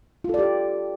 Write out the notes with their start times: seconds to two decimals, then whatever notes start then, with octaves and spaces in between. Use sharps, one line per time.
0.24 F4
0.29 A4
0.34 D5
0.39 G4